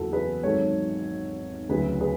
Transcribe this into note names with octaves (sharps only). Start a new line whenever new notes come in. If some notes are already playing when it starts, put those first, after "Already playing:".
Already playing: F#1 E2 E4 F#4 A4
G#4 B4
G#1 G#2 F#3 A4 C#5
D2 C#3 F#3 G#4 B4
G#4 B4